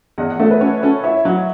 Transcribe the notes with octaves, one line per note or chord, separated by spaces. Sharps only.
E2 D#5 F#5
F#5
A3 C#5 E5
B4
C#4 A4 C#5
C#4 A4 C#5
E4 C#5 E5
F#3 D#5 F#5